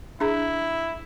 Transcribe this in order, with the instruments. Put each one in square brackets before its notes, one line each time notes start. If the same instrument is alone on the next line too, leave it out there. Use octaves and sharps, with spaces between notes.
[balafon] D4 G#4 A#5 [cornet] E4